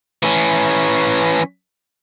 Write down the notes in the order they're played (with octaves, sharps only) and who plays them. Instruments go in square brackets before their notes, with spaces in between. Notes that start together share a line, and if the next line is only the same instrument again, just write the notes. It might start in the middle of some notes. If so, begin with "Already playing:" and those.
[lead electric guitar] E3 C#4